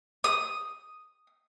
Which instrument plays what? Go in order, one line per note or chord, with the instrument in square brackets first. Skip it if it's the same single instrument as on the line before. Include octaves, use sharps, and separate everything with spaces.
[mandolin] D#6